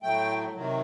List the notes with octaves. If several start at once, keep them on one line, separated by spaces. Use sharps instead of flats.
A2 F#3 A3 G5
C3 D#3 F#3